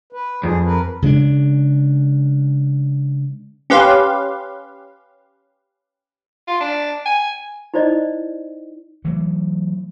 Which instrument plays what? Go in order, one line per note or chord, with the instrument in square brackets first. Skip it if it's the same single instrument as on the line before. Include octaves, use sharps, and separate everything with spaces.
[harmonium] B4
[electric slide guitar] F2 [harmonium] G#4
[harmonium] A#4 B4
[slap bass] C#3 G#3 A#3 D4
[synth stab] C#4 G4 B4 F5 C6
[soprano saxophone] F4
D4
G#5
[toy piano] D#4 E4 C5 D5 D#5
[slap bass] E3 F#3 A3